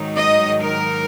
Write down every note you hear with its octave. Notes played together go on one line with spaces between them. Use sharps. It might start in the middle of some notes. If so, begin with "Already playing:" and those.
Already playing: G#2 D#3 F#3 D#4
D#5
A#4